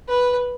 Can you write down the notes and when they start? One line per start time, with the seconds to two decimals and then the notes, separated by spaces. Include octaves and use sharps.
0.08 B4